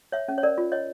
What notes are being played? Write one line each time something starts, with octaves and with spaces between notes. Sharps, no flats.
C#5 E5
C#4
C#5
A#4 D5
F4
C#5 D#5